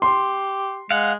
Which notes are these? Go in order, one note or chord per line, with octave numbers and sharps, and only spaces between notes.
G4 C6
G#3 F5 F#5